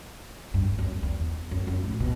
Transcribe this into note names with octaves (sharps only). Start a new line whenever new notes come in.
G2
F#2
E2
F#2
F#2
A2
B2